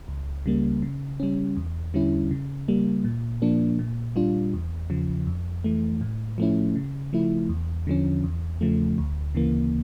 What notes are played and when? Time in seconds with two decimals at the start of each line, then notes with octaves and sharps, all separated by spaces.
0.08 C#2
0.46 C#3 G3 A#3
0.82 C#3
1.20 G3 C#4
1.57 E2
1.94 D3 G3 C#4 E4
2.31 C#3
2.68 G3 A#3
3.04 A#2
3.42 F3 A#3 D4
3.79 A#2
4.16 G3 D4 F4
4.54 E2
4.90 C#3 F3
5.27 F2
5.64 E3 A3
6.01 A2
6.38 F3 A3 C#4 E4
6.76 C#3
7.13 F3 A3 E4
7.49 E2
7.87 D3 F3 C#4
8.24 E2
8.61 C#3 F3 A3
8.98 D2
9.35 C#3 E3 A#3